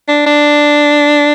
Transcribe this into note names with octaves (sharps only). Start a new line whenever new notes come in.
D4
D4